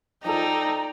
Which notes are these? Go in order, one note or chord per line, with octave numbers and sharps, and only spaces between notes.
F3 D#4 A4 D5 G5 A#5